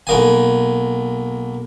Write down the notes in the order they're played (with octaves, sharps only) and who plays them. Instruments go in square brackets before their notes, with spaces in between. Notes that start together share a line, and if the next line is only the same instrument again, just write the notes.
[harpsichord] B1 A#3 G#5